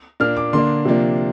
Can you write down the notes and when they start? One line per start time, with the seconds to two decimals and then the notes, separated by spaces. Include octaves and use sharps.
0.20 A#2 A#3 D4 F6
0.37 D6
0.53 D3 A#3 D4 C6
0.85 C3 F3 A#3 D4